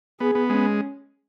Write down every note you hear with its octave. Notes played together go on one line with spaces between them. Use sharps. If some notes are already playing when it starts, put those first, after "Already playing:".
B3 G#4
B3
G#3 C#4